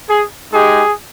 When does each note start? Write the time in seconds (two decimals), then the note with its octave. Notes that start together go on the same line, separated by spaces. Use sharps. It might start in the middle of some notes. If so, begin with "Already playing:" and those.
0.09 G#4
0.52 G#3 D#4 G4 G#4